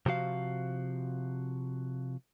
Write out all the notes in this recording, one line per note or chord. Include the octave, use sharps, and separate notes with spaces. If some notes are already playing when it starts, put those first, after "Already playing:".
C3 F3 F#4 F5